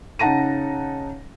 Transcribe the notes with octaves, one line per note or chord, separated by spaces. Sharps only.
C#3 D#4 F#5 A5 A#6 D#7